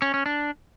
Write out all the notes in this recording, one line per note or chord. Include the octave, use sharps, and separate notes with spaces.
C#4
C#4
D4